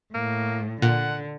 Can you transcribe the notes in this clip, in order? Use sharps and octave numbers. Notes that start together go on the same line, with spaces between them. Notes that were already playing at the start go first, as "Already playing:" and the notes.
A2 A#3
A#2 D3 F#5